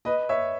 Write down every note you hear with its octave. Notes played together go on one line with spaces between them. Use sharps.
B4 D#5
C#5 E5